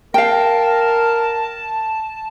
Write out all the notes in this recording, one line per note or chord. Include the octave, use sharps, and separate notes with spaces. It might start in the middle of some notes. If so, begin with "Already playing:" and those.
A#4 F5 G5 A5